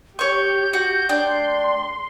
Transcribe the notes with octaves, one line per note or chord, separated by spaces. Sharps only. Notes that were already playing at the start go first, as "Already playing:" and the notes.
G4 C#5 C#6 G6
F#4
D4 G5 C6